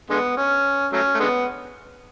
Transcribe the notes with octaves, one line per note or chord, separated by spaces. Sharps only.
D3 G#3 B3
C#4
F#3 A3 C#4
A3
D3 G#3 B3